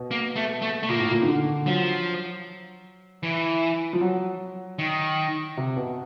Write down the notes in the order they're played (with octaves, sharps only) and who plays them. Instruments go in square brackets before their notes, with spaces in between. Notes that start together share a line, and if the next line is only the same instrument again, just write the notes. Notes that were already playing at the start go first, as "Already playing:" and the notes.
Already playing: [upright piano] B2
[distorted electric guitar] A#3
A3
A3
A3
[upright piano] A#2 [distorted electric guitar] A#3
[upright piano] A2
A#2
D#3
D3
[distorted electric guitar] F3 [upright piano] F#3
[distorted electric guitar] E3
[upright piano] F3
F#3
[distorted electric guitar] D#3
[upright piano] C3
B2